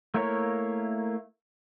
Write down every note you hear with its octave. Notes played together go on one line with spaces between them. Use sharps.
A3 A#3 E4 A#4 C#5